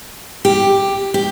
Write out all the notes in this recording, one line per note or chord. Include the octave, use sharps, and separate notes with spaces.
G4
G4